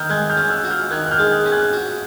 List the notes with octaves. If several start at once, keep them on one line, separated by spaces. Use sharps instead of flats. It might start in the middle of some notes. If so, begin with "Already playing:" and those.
Already playing: D#3 E6 F6 G6
G#3 F#6 G#6
F6 G6
C#4
E6 F#6
F#4
F6 G6
D#3 F#6 G#6
F#6
F6 G6
G#3
F#6 G#6
C#4
F#6 G#6
F#4